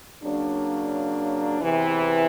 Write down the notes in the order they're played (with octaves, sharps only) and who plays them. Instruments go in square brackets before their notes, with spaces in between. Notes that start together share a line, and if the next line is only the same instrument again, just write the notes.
[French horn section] C#3 F#3 A#3 D4
E2 C3 E3